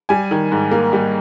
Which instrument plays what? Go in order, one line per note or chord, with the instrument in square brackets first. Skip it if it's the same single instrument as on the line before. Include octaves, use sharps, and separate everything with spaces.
[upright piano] G3 G#5
D#3
G#2
A#3
G3